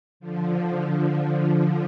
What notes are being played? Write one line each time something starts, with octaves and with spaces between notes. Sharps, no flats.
D3 F3